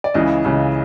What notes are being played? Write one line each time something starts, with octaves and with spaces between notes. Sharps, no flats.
D5
C#2 C#3 E3 D#5
C#2 C#3 E3